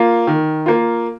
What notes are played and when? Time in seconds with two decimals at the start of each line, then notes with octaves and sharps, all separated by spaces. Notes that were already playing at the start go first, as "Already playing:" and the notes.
Already playing: A#3 F4
0.27 D#3
0.66 A#3 F4